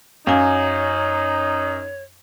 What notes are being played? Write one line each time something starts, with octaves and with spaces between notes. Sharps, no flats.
F#2 D#4 C#5 F5 G#5